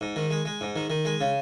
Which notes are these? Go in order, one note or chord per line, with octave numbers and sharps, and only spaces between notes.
G#2
D#3
G#3
G#3
G#2
D#3
D#3
G#3
C#3